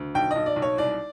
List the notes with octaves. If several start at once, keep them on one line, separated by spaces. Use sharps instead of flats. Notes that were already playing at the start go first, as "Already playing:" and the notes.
Already playing: D2
B1 G5
B1 D#5
D5
B1
C#5
C2 D5